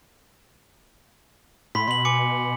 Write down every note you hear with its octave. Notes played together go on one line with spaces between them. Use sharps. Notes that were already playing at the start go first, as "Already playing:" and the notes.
A2 B5 C6 B6
B2 C6 F#7
G#5 D6 C#7